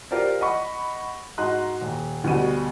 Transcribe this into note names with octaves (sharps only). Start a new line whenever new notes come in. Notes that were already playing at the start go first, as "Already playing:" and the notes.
F4 G4 A#4 C5 D5
D#5 F#5 B5 C#6
G#2 F#4 D#5 A#5 C6 F#6
D#1
D2 B2 G3 D#7